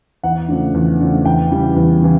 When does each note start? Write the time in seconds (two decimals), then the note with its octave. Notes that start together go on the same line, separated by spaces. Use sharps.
0.23 E2 F#5
0.48 C#3 F3 A3 D4
0.74 E2
1.00 C#3 F3 A3 D4
1.25 E2 G5
1.50 C#3 E3 G3
1.76 E2
2.02 C#3 E3